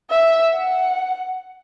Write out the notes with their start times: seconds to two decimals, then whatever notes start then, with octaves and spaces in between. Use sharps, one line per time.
0.10 E5
0.54 F#5